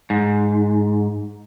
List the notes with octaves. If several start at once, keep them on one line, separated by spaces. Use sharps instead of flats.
G#2